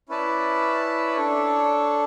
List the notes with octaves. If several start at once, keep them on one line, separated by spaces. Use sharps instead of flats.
C#4 E4 B4 D5 A5
D4 A4 C#5